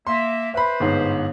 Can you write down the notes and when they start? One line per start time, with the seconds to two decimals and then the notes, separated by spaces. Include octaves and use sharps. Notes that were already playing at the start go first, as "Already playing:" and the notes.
0.07 A#3 E5 C6
0.54 B4 C5 E5 B5
0.80 G1 G#2